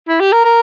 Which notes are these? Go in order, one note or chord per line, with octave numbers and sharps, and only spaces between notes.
E4
G4
A#4
A#4